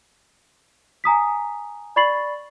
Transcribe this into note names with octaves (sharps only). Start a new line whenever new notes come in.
G#5 A#5 D#6 B6
D5 B5 C#6 A6 C7 F#7